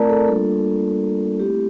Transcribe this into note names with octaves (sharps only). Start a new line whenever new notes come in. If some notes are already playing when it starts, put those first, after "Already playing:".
Already playing: A3 C4 E4 A#4 D5 A5 A#5
A4
G3 A#3 D4 F4 A4
A3 C4 E4 G4